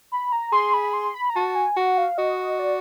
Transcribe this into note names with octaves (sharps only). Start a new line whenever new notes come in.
B5
A#5
G#4 C6
B5
C6
B5
A#5
F#4 A5
G#5
F#4 F#5
F5
F#4 D#5
D5